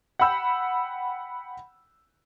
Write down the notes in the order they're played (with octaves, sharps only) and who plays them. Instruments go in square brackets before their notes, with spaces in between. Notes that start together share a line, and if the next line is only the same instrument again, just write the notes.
[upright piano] F#5 G5 B5 E6 G6